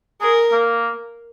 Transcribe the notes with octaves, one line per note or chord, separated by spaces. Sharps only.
G#4 A#4
A#3